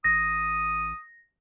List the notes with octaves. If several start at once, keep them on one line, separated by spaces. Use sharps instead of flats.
A1 D#6 A#6